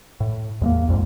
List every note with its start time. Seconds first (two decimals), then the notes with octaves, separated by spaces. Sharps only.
0.20 A2
0.61 E2 G#3 A#3
0.88 A#1 F2 G#2